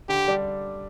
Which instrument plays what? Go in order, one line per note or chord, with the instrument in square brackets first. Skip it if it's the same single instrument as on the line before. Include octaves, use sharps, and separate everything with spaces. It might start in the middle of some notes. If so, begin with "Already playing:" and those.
[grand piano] D3 [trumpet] G4
[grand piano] G3 D4